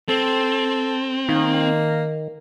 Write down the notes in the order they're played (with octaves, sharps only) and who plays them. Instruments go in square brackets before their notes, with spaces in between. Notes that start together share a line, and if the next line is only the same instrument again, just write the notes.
[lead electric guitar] C4 [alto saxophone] A4
[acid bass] D#3 [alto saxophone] A#3